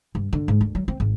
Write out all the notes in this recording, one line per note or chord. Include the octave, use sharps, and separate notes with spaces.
G2
D3
G#2
D2
F#3
C4
G#1